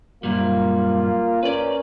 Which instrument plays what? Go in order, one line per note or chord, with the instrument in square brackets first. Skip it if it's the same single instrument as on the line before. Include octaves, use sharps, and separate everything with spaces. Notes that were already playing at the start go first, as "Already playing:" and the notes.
[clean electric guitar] F#2 A#2 G3 [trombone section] A#3 F4
[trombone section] C#4 A#4 [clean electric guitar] B4 D5